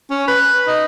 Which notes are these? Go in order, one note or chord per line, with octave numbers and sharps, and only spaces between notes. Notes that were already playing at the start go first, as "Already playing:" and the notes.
C#4
B4
D#4